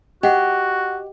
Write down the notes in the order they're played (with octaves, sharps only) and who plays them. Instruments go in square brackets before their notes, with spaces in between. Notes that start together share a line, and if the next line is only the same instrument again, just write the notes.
[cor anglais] F#4 [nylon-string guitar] G4 [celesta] D#5 F#5